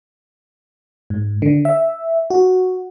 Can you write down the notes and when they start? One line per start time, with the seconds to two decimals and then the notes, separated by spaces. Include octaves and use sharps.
1.10 G#2
1.42 D3
1.65 E5
2.30 F#4